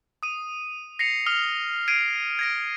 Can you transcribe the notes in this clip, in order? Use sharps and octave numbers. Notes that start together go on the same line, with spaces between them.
D#6 D#7
A#6 C7 C#7 F7
D#6 F6 F7 G7
G#6 C7 D7 D#7
G#6 A#6 D7